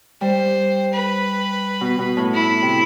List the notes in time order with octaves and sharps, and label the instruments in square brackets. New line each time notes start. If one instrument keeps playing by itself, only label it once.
[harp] G3 [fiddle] C5
[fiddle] B4
[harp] B2
B2
A2
[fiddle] E4
[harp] C3